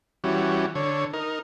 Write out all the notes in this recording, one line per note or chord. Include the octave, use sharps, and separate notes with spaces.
E3 G3 C#4 F#4
D3 C#5
D#4 A#4